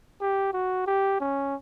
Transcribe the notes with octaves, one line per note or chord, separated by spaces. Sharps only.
G4
F#4
G4
C#4